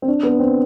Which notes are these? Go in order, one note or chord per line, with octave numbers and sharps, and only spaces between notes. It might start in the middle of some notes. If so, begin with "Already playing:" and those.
C4
D4
B3
C4